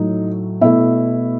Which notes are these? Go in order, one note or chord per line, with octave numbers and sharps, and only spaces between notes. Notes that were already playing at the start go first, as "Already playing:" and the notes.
Already playing: A2 F#3 A3 D#4
B2 A3 E4 E5